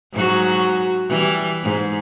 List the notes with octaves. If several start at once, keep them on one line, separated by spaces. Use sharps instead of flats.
G#2 F#3 F#4
E3 G3
G#2